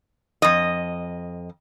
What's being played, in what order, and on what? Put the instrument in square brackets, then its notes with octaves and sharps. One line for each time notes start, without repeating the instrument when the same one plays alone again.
[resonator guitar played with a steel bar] F2 D#5